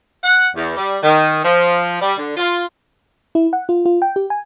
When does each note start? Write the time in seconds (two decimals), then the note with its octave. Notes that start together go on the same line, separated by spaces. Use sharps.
0.23 F#5
0.56 E2
0.76 G3
1.03 D#3
1.44 F3
2.01 G3
2.18 D3
2.37 F4
3.35 E4
3.53 F#5
3.69 F4
3.85 F4
4.02 G5
4.16 G4
4.30 G#5